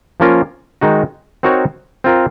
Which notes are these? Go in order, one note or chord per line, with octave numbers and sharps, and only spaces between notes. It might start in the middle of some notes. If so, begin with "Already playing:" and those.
F3 A#3 C#4 F4 A#4
D#3 G#3 D#4 F#4
C4 D#4 F#4 A#4 C#5
C4 F4 A#4